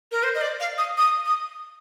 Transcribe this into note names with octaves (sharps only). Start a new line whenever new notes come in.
A#4
C5
D#5
D5
F5
D#6
D#6
D#6